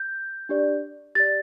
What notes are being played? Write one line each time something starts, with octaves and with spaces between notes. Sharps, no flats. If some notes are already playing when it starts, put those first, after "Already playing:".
Already playing: G6
D4 G4 D5
G4 D5 A6